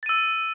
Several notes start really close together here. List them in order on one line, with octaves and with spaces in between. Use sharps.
A6 D#7 E6